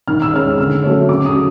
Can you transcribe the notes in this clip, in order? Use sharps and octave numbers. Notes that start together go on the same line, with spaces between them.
D#3 F6
E6
G#3 C#4 F6
D3 E6
F#3 A3 C#4
C#3 D6
D#6
F#3